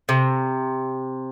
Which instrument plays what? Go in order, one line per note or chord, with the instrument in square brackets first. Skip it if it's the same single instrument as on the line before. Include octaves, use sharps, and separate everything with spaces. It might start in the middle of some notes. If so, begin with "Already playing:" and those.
[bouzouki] C3